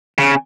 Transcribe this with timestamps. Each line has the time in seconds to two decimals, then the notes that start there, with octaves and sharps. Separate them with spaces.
0.18 C#3